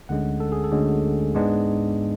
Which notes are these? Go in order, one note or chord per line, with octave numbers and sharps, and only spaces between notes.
D2 D3 G#3 C#4 F#5
A4
G#4
A4
D2 D3 G#3 C#4
G#2 G#3 B3 D4